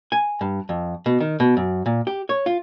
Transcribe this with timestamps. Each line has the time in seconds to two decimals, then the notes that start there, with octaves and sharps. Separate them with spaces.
0.12 G#5
0.41 G2
0.69 F2
1.06 B2
1.20 D#3
1.40 B2
1.57 F#2
1.86 A#2
2.07 G4
2.29 C#5
2.46 F4